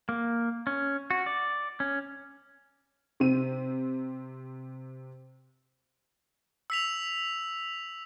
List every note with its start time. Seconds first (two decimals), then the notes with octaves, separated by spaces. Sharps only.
0.09 A#3
0.67 C#4
1.10 F#4
1.26 D5
1.80 C#4
3.20 C3 C4 D#7
6.70 E6 B6 F7